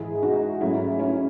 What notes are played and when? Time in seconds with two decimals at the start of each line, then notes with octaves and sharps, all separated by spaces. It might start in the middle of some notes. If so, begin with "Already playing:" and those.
Already playing: G#2 E3 G#3 E4 G#4
0.22 D#4 F#4
0.61 G#2 F#3 A3 C#4 E4
0.99 C#4 E4